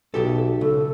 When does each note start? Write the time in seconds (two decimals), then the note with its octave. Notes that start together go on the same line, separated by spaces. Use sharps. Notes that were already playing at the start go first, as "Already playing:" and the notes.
0.14 B1 B2 G4 A4
0.61 C#2 A4